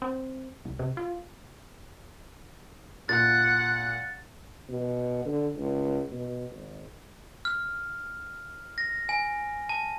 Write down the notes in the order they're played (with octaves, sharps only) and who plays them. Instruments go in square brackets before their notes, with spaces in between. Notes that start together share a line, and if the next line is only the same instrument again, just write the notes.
[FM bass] C4
C2
C3
F4
[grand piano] A#2 [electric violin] F#5 [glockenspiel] A6
[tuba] B2
D3
C#2
B2
G#1
[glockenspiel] F6
A#6
G#5
A5